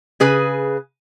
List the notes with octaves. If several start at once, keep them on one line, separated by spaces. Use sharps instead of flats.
C#3 G#4 B4 G#5